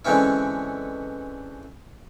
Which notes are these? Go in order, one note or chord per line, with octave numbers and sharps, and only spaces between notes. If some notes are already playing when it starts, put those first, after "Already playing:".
D3 E3 G#3 C4 C#4 E4